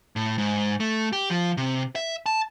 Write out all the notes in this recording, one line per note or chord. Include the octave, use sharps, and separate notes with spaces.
A2
G#2
A3
G4
F3
C3
E5
A5